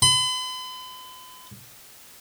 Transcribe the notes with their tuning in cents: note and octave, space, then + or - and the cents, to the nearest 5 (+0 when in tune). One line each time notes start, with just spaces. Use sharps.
B5 +45